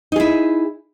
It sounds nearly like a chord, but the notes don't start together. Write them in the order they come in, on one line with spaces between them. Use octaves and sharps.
D#4 G#4 E4